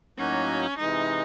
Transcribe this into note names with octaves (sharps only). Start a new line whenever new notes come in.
A2 F#3 A#3 C#4 D#4 F#4
C3 E3 G#3 D#4